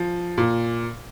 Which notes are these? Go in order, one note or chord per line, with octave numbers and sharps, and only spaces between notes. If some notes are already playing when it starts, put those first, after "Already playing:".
Already playing: F3
A#2